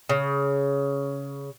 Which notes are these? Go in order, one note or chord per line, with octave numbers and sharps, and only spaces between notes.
C#3